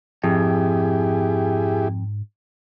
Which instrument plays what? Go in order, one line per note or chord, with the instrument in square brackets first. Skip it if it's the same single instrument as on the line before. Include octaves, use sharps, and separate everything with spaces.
[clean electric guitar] F2 [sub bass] G#2 [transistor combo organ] E4 G4 G#4